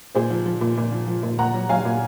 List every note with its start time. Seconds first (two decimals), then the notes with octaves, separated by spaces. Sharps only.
0.15 A#2 G#4 C5
0.31 F3
0.46 F3
0.61 A#2
0.77 A#2
0.92 F3
1.07 F3
1.23 A#2
1.39 A#2 F#5 A#5
1.54 F#3
1.69 F#3 F5 G#5
1.85 A#2